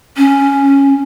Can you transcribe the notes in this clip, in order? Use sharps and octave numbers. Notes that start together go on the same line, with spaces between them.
C#4